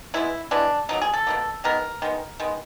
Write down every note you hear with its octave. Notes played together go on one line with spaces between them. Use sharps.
E3 G#3 B3 E4
E3 G#3 B3 D4
B2 F#3 A#3 D#4
G#4
A4
B2 F#3 A#3
D#3 G#3 B3 A#4
D#3 G#3 B3
D#3 G#3 B3